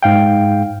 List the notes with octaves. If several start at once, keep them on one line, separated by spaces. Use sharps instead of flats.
G#2 F5 G5